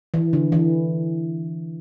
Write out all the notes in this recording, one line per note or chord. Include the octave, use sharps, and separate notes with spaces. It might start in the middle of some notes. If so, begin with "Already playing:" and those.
E3
D3
E3